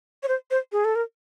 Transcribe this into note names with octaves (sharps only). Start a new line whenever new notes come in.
C#5
C5
C5
G#4
A4
A#4